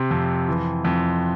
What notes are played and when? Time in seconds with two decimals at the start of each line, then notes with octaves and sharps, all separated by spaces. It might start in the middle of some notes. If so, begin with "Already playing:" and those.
Already playing: C3 C6
0.11 F2
0.48 E3
0.84 F2